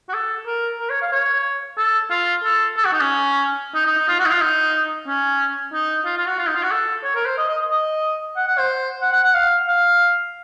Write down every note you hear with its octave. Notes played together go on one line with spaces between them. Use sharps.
F#4
A4
A#4
A#4
C#5
F5
C#5
A4
F4
A4
A4
F#4
D#4
C#4
D#4
D#4
D#4
F4
F#4
D#4
F4
D#4
C#4
D#4
F4
F4
F#4
F4
D#4
F4
F#4
A4
C#5
A#4
C5
D#5
D#5
D#5
F#5
F#5
C5
F#5
F#5
F#5
F5
F5